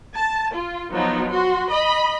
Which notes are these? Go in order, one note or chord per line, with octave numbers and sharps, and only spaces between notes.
A5
F4
F3 F#3 B3 D#4
F#4 C6
D#5 B5